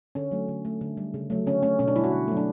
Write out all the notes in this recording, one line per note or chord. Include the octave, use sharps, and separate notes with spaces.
D3 C#4
F#3 A3
D3
A3
D3
G3
C#3
F#3 A3
D3 C#4
A3 C#4
B2 C#4
D4
G3 E4
F#4
D3
F#3 A3
D4